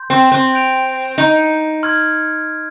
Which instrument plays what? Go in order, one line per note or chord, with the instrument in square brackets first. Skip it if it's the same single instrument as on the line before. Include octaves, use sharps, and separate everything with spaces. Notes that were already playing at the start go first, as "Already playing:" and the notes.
Already playing: [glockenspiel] C6 G6
[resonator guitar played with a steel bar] C4
C4
[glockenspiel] G6 D7 F7
[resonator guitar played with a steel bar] D#4
[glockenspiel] C6 F6 G#6